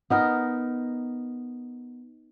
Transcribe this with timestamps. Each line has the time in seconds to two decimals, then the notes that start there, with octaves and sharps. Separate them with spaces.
0.10 B3 D#4 A#4